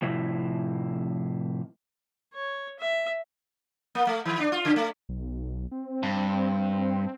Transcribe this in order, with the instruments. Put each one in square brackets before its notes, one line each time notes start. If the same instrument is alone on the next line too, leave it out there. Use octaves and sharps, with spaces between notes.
[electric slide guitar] A2 C3 F3 E4
[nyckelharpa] C#5
E5
[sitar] A#3
A3
D#3
D4
F4
C#3
A3
[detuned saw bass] B1
C4
[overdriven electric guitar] G2